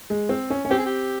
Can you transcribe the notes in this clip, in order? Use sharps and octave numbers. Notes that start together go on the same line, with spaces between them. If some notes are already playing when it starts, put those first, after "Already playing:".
G#3
C4
C#4
C#4
C4 G4
G#4
G4